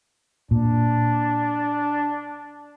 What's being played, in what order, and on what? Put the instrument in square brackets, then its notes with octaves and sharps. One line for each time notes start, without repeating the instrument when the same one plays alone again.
[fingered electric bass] A#2 [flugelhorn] D4